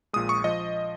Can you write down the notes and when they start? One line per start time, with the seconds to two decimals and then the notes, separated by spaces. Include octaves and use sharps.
0.13 A#1 A#2 G#3 D#6
0.29 C#6
0.44 F3 D#5